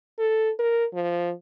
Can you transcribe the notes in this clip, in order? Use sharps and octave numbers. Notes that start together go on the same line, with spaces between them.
A4
A#4
F3